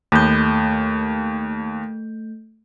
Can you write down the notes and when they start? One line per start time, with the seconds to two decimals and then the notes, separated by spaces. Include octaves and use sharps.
0.12 D#2 A3 G6